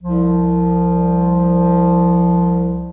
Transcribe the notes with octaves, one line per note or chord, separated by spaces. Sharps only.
C2 F3